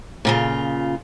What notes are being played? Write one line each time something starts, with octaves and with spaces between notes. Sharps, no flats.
A#2 C#3 F4